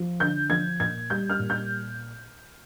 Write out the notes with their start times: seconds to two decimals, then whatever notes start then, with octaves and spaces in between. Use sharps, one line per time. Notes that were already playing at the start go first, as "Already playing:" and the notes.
Already playing: F3
0.20 D3 G6
0.50 F3 G#6
0.80 A#2 G#6
1.10 G3 G6
1.30 F6
1.39 A#2
1.50 G6